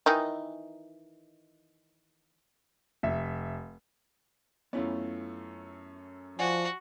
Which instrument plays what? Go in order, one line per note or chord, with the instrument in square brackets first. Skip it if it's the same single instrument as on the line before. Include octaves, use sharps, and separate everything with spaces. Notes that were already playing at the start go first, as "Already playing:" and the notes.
[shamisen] D#3 E3 D#4
[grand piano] F1 E5
[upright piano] F#2 A3 C#4 [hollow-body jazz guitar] B3 E4 F4
[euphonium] F3 [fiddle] F#4 [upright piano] D5 F#5 D6 [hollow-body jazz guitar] G#5